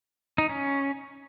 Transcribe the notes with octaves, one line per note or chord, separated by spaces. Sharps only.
D#4
C#4